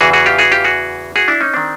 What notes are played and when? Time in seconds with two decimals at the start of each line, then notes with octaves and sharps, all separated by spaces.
0.01 E2 C#3 E3 F#4 G#4
0.13 F#4 G#4
0.26 F4 G4
0.39 F#4 G#4
0.52 F4 G4
0.64 F#4 G#4
1.16 F#4 G#4
1.28 D4 E4
1.41 C#4 D#4
1.54 D#3 C4 D4